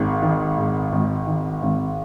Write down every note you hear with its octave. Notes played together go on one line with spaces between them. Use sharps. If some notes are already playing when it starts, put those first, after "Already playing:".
Already playing: G#1 G#2 D#3
D#3
G#2
G#1
D#3
G#1